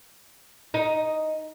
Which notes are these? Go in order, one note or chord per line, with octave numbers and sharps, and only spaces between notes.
D#4